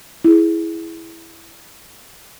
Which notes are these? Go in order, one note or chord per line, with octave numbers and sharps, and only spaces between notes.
E4 G#4